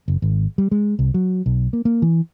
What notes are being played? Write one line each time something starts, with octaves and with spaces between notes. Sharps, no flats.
F#1
G#1
G3
G#3
C2
F#3
B1
A#3
A#3
E3